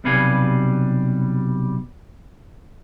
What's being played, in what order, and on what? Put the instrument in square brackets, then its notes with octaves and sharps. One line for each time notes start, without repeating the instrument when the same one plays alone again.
[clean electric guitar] B1 C3 G3 B4 F5 G#5